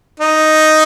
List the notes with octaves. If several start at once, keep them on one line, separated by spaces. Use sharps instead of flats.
D#4